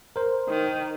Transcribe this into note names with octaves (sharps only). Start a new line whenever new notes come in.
A#4 C5
D#3